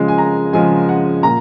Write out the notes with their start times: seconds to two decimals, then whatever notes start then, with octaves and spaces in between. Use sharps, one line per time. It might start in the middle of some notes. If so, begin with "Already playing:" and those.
Already playing: C#3 F3 G#3
0.08 G#5
0.18 A#5
0.53 C#3 F3 G#3 G#5
0.89 F#5
1.23 A#2 A#5